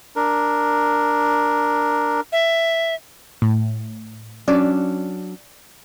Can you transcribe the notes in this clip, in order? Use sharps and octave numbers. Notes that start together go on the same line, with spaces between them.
D4 A#4
E5
A2
F#3 C#4 D4 D5